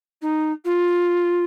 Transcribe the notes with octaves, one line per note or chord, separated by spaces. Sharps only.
D#4
F4